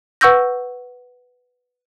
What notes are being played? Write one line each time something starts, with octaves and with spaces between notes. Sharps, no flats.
B4 F#5 C#6 E6 G6 A#6